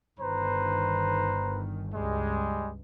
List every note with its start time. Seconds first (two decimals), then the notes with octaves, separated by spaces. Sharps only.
0.19 G1 D#3 B4 C5 A#5
1.92 C#2 G2 G3 G#3